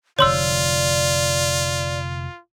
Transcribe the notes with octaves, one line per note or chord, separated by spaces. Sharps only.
F1 D3 F4 C#5 D5 C6 E6